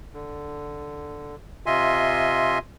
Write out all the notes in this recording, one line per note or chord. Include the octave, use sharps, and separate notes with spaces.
D3
C3 F4 D#5 E5 G#5 C6